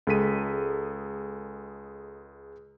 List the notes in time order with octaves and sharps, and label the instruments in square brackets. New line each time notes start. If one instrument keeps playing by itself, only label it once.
[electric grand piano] C#2 G#3 A4 B6 D#7